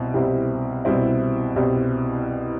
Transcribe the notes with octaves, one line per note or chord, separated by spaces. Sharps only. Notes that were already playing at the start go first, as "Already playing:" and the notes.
Already playing: C2 B2 C4 E4
C2 B2 G3 C4 E4
C2 B2 G3 C4 E4
C2 B2 G3 C4 E4